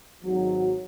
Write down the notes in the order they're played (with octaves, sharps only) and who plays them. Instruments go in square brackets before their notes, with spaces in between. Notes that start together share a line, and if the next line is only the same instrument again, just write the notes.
[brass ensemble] G#1 G#2 F#3